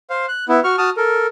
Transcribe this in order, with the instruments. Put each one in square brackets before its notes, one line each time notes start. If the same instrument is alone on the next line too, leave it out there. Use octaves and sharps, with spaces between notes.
[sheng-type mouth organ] C5 F5
F#6
B3 E4
F#4 C#6 F6
F#4 A5 D#6 F6
A4 A#4